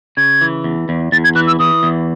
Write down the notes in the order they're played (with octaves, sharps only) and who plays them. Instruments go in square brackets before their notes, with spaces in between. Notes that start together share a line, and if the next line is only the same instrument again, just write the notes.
[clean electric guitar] C#3 [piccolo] G#6
[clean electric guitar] E3
E2
E2
[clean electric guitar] E2 [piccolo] A6
[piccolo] G#6
[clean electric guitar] E3 [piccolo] F#6
[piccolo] E6
[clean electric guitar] E3 [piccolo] D#6
[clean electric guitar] E2